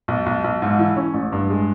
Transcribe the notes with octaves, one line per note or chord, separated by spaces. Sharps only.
B1
B1
B1
G#2
E3
C#4
A1
G2
G#3